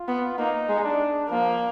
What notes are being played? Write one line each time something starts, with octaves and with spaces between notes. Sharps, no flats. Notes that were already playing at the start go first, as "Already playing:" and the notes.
Already playing: F4
B3
A#3 D#4
G#3
D4
F3 A#3